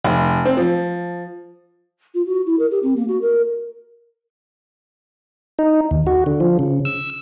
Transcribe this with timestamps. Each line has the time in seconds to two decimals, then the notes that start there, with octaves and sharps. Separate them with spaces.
0.04 F1
0.45 C4
0.57 F3
2.14 F4
2.26 F#4
2.46 E4
2.59 A#4
2.71 G4
2.83 C4
2.96 A#3
3.08 F#4
3.21 A#4
5.59 D#4
5.91 D#2
6.07 F#4
6.26 D3
6.40 F3
6.59 C#3
6.85 E6